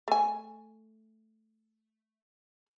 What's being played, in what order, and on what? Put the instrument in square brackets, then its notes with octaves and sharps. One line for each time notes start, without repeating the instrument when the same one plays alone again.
[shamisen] A3 G#5